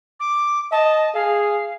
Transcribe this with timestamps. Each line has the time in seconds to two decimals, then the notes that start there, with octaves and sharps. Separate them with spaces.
0.20 D6
0.72 D#5 A5
1.14 G#4 F5